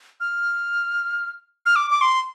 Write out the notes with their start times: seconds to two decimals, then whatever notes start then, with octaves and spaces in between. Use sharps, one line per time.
0.20 F6
1.66 F6
1.76 D6
1.90 D6
2.01 C6